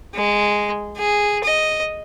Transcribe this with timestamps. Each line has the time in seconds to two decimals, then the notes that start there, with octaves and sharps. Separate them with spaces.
0.14 G#3
0.97 G#4
1.44 D#5